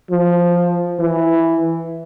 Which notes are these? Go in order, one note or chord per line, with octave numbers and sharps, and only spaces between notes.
F3
E3